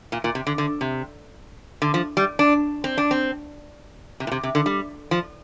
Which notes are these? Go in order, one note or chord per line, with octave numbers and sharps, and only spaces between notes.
A#2
A#2
C3
D3
D3
C3
D3
F3
G3
D4
C4
D4
C4
C3
A#2
C3
C3
D3
G3
F3